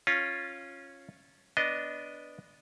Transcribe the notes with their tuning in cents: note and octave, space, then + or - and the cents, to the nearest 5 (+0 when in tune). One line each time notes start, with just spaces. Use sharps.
C#4 -10 F4 +0
B3 +0 D4 -10 D#5 +0